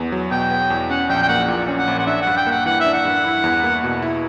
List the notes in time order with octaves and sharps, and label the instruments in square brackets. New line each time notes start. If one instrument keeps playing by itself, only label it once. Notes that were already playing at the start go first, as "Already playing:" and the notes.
Already playing: [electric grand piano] E2 B3
F#3
[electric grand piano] B2 [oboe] G5
[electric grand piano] B3
E2
[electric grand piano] C#4 [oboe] F#5
[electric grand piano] A#1 [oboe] G5
[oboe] G5
[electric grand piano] A#3 [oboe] F#5
[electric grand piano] A#2
C#4
[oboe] F#5
[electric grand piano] A#1
[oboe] F#5
[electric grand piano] D4 [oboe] E5
[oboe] F#5
[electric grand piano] G2
[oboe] G5
[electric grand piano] A#3 [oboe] F#5
[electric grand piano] E3 [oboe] F#5
[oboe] E5
[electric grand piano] D4
[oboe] F#5
[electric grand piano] G2
E4
E2
A#3
B2
E4